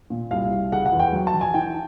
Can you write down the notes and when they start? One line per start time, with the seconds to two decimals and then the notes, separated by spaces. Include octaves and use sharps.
0.10 A#2
0.31 C2 F5
0.51 C2
0.72 C#3 F#5
0.86 F#5
0.92 E2
0.99 G5
1.13 F#3
1.27 A5
1.34 F1
1.41 G#5
1.54 E3 G5